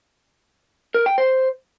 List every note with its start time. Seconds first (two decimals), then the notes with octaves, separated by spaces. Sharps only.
0.94 A#4
1.06 G5
1.18 C5